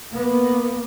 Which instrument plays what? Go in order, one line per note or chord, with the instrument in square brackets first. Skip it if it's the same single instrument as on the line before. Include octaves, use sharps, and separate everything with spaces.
[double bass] A#3 B3